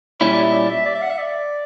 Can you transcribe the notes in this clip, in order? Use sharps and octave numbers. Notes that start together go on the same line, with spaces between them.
A#2 G3 C#4 E4 C#5
D5
E5
D5
E5
D5
E5
F#5
E5
D5